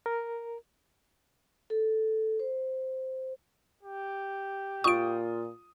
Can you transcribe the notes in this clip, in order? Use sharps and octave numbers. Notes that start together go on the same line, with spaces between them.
A#4
A4
C5
G4
A#2 F4 C#6 D#6 D7